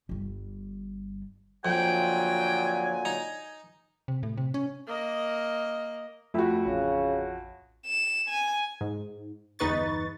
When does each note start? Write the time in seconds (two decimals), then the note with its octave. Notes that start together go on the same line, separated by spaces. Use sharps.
0.09 G1 G3
1.65 F2 A#2 D3 F#3 G5 G#5
3.05 D#4 A#5
4.08 C3
4.23 A2
4.38 C3
4.54 C#4
4.88 A#3 D#5
6.34 F2 A3 F#4 E5 B5
6.66 A1 C#3
7.86 E7
8.29 G#5
8.81 G#2
9.59 G1 E2 D#4 B4 C#6 A6